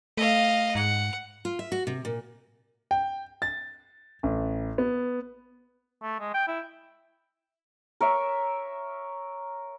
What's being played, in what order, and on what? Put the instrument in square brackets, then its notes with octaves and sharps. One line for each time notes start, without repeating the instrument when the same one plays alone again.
[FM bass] A3 [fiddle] D#5 F5
[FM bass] G#2 [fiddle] F#5
[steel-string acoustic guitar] F4
E5
F#4
C3
A#2
[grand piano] G5
A6
A1
B3
[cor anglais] A3
G#3
G5
E4
[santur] A#4 C#5 E5